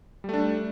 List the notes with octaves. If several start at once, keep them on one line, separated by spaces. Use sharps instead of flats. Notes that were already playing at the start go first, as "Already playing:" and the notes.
G3 A3 D4